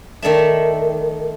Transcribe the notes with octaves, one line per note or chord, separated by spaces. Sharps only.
D#3 A3 D5 E5